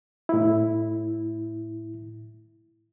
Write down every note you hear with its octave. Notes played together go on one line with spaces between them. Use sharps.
A2 E4